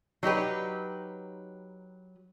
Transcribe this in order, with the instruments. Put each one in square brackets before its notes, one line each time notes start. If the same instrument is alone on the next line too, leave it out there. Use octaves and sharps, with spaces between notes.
[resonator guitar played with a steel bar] F#3 D#4 G4 B4